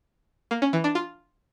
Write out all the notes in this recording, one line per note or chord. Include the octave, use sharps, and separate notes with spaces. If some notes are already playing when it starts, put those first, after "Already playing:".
A#3
C#4
E3
D4
F4